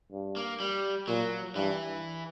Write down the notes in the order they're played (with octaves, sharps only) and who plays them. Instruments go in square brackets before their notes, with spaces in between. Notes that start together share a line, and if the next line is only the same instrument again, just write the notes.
[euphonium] G2
[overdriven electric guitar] A#3
G3
[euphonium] A#2 [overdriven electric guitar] F#3
[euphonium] G2 [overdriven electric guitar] E3